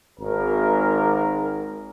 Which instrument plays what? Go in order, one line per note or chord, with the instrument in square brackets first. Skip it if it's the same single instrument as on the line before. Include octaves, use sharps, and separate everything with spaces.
[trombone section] G#1 A#4